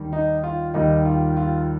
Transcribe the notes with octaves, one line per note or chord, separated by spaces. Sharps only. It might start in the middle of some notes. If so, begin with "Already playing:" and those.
Already playing: D#2 D#3 G3
D#4
F4
D#2 D#3 G3 D#4
F4
F4